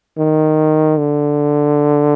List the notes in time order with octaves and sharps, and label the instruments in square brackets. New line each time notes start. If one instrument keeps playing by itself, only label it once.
[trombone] D#3
D3